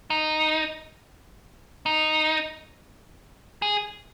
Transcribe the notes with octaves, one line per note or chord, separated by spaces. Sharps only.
D#4
D#4
G#4